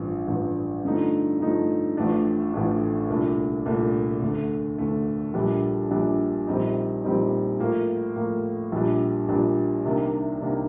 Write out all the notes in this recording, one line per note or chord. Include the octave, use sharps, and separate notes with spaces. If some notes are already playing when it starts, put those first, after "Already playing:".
Already playing: A1 G2 F3
A1 G2 F3
G2 D3 F3 A3 D#4
G2 D3 F3 A3 D#4
A1 A2 F3 A3 D4
A1 A2 F3 A3 D4
C2 A#2 A3 D4
C2 A#2 A3 D4
D2 D3 A3
D2 D3 A3
A#1 A#2 G3 D4
A#1 A#2 G3 D4
A#1 A#2 G3 C4 D#4
A#1 A#2 G3 C4 D#4
A2 F3 A#3
A2 F3 A#3
A#1 A#2 G3 D4
A#1 A#2 G3 D4
C2 C3 D#3 A#3 D4
C2 C3 D#3 A#3 D4